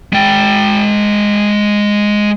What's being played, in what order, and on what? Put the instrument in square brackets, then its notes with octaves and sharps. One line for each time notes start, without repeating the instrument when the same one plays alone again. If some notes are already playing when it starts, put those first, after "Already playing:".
[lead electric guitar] G#3 G5